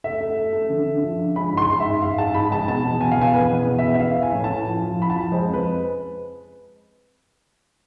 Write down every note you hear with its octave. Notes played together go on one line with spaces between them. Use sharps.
A3 E5
A3
A3
A3
D3
D3
F3
D4
G#3 B5
G#2
C6
G#3
G#2 E5
G#2 F5
G#2 A5
G#2 B5
G#3 A5
B2 A5
E2
B2 G#5
F5
B3 G#5
E2 B4
B2
E2
E5
B3
E5
B3 F5
E4
G#5
A2
A5
E4
F3
F3
E4 B5
A5
F3
G#3 C5
F2
B4